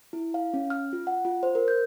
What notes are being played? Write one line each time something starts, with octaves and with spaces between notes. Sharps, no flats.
E4
F5
C#4
F6
F4
F#5
F4
C5
A#4
G6